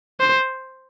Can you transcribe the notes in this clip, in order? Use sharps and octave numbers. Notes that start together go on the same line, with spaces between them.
C5